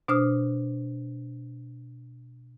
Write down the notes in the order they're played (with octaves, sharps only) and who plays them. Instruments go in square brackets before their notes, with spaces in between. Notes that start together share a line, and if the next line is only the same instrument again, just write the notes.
[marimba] B2 D4 C5 D#6 F6